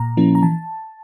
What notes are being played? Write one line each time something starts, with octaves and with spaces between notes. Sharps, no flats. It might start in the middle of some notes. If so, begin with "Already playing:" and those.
Already playing: A#2 A#5
F3 A#3 C#4 E4
A#5
E3 A5